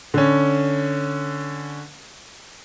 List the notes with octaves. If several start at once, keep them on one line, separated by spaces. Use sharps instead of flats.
D3 C#4